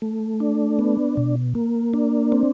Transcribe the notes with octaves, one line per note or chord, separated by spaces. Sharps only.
A3
D4
B3
B2
A#3
D4
C4